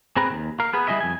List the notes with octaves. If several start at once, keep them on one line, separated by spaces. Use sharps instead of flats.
C4 G#4 B4 A#5
D#2
A#4 F5
B3 G#4 B4
G3 E4 G#4 D#5 E5
F2 G#5